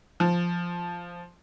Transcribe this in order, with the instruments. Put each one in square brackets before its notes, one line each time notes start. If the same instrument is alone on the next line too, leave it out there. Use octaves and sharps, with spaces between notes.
[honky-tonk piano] F3